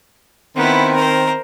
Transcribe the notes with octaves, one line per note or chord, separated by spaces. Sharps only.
D#3 B3 C4 E4
A#4 C5